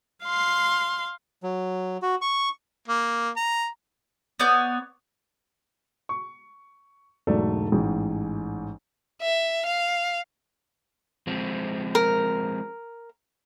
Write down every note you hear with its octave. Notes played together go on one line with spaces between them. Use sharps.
F5 C6
F#3
F#4
C#6
A#3
A#5
B3 C#5 D5 G6
C#6
E1 G#2 F#3 A3 A4 D5
A1 G#2
E5
F5
F3 G#3 C4
A#4